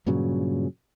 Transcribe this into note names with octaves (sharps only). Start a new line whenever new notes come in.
G2 A#2 C#3 F#3